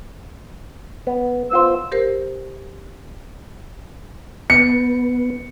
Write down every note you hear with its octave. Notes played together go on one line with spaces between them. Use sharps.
B3
B3 F4 C5 E6
G4 A#4 C5
B3 C#7